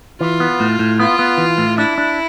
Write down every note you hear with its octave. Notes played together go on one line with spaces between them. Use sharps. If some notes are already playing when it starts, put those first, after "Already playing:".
E3 F4
B3
A2
A2
B3 F4
B3
E3
A2
D4 E4
D4